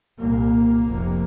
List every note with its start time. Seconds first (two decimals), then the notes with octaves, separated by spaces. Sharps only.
0.19 C2 A#2 A#3
0.84 F1 F2 C3